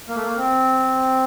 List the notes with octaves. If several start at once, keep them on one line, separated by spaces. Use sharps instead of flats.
A#3
A3
A#3
C4